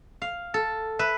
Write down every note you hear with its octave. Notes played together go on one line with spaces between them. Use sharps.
F5
A4
B4 E5